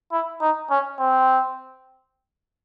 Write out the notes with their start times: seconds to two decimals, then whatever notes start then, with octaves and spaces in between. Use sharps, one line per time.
0.12 E4
0.42 D#4
0.70 C#4
0.99 C4